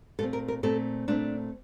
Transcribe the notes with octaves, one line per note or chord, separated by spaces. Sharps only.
A#2 A3 C4 A4
A#4
A#4
A#2 A3 C4 A4
A#2 A3 C4 D4